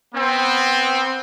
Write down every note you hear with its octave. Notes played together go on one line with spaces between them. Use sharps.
B3 C4